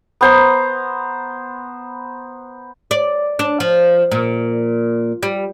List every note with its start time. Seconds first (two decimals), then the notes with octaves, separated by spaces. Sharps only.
0.21 B3 C5 A#5
2.91 D5
3.39 D4
3.60 F3
4.12 A#2
5.23 G3